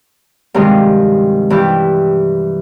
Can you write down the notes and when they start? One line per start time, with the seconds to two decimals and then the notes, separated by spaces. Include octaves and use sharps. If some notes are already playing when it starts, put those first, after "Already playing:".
0.54 G2 C3 D#3 F3 G#3
1.50 G2 E3 E4 G4